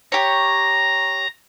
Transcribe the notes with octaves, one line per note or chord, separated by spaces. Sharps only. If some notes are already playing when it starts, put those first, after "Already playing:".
G4 C#5 A#5